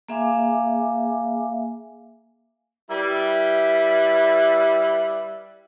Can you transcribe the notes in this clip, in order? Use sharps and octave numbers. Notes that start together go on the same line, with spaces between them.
A#3 G#4 E5 F5 G#5 D6
G3 E4 B4